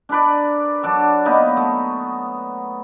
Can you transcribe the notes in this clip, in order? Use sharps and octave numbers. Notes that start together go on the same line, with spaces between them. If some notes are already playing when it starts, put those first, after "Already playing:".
D4 A#4 B4 D5
F#3 D4 A4 D5
A#3 B3 D#4 B4
A3